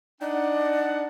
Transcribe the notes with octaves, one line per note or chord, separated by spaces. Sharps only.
D4 D#4 D5 F#5